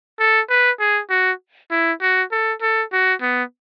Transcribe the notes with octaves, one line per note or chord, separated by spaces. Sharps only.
A4
B4
G#4
F#4
E4
F#4
A4
A4
F#4
B3